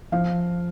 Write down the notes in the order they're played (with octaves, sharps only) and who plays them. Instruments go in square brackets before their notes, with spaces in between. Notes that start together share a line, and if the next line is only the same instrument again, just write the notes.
[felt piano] F3 F5